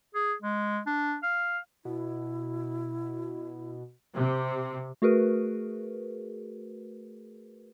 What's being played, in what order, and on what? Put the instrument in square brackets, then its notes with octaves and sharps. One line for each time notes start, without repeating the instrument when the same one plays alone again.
[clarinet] G#4
G#3
D4
F5
[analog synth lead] B2 [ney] E4
[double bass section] C3
[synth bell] A3 F#4 G#4 A#4 B4